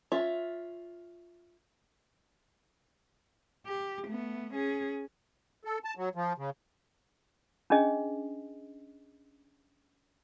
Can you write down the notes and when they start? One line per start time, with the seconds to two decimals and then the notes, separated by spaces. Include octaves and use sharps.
0.12 C#4 F4 E5
3.66 G4
4.07 A3 B3
4.54 C#4 G#4
5.65 A4
5.85 A5
5.97 F#3
6.15 F3
6.38 C#3
7.70 C#4 D4 G#4 D#5